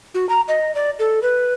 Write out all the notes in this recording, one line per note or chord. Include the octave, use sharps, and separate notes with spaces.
F#4
A#5
D#5
D5
A4
B4